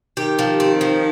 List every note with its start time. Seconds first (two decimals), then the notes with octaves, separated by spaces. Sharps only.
0.17 D#3 G4
0.39 F3
0.60 C4
0.81 F3